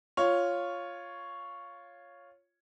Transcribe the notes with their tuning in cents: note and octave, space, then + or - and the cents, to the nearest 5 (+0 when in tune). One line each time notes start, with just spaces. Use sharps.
F4 +0 C#5 +0